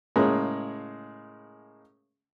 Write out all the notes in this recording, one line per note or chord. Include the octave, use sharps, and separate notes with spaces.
A2 C#3 G#3 A#3